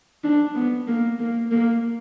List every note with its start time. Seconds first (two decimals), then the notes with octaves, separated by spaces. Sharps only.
0.24 D4
0.55 B3
0.87 A#3
1.19 A#3
1.51 A#3